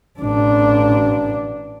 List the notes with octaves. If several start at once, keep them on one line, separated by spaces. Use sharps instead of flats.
A1 D4